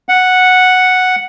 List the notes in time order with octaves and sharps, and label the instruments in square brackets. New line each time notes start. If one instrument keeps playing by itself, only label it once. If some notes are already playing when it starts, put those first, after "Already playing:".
[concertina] F#5